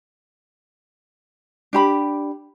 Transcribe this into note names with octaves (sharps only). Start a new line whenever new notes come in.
D4 G4 B5